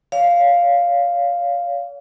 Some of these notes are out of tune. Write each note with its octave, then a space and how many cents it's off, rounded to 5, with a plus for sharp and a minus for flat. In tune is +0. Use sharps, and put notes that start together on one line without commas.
C#5 +45 F5 +0